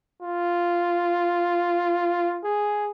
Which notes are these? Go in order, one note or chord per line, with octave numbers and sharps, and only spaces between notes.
F4
G#4